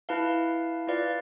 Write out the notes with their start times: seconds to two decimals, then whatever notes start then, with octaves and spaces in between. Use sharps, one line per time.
0.09 E4 B4 F5 A5
0.87 F4 B4 D5 F5